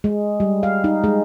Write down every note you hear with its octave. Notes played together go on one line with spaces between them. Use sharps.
G#3
G3
F5
D#4
G#3